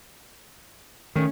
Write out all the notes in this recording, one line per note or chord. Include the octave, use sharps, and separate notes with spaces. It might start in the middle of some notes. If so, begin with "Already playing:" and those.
D#3 A3 C#4